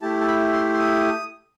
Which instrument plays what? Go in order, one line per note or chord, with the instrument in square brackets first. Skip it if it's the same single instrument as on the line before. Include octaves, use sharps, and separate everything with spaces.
[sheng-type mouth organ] A3 E4 G4 A5
A5
B5
C6
C6
D#6